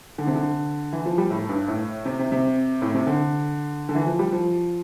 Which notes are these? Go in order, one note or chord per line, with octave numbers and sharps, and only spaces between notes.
D3
C3
D3
E3
F3
G3
A2
G2
A2
C3
C3
C3
A2
C3
D3
D3
E3
F3
G3
F3